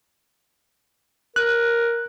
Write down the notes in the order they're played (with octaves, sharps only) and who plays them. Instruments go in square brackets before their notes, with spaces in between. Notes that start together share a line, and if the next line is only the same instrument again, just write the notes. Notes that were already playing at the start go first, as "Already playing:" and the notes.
[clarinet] A#4 [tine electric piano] F#6